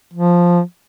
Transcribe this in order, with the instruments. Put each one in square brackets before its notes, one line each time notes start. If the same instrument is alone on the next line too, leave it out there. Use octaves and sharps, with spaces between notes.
[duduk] F3